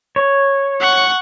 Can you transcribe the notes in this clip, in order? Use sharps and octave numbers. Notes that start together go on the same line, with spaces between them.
C#5
F#5 C#6